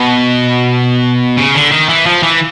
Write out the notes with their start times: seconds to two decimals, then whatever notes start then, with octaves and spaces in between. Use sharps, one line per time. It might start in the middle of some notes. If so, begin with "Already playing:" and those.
Already playing: B2
1.37 C#3
1.55 D3
1.71 D#3
1.89 E3
2.06 F3
2.23 E3